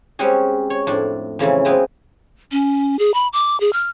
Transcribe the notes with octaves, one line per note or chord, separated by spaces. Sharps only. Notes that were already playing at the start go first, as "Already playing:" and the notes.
G3 G#3 C4 C#4 F#4 G#4
C#5
F2 A2 D4
F2 C#3 E3 F#3
F3 G#3 B3 C4 E4
C#4
G#4
B5
D6
G#4
F6